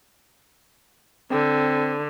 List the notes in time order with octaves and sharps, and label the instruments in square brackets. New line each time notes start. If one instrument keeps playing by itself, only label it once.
[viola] D3 [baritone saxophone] C4